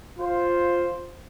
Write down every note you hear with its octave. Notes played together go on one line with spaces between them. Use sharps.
F4 C5